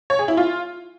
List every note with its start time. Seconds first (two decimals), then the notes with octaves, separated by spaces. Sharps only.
0.10 C#5
0.19 G#4
0.28 E4
0.37 F4